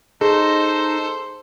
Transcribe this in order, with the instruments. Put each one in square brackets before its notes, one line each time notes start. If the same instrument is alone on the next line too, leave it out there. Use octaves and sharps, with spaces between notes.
[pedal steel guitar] D#4 [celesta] G#4 [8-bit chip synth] A4 [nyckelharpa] C5